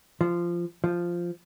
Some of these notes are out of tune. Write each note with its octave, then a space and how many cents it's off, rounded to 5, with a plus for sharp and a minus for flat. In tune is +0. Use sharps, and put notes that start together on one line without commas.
F3 -15
F3 -5